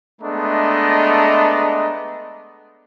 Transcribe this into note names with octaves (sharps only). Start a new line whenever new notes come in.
G#3 A3 B3 D4 D#5 A#5